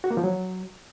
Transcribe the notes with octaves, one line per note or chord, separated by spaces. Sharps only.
F#4
A#3
F3
F#3